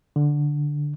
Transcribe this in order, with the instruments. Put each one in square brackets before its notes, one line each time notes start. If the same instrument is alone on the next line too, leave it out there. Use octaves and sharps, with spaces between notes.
[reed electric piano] D3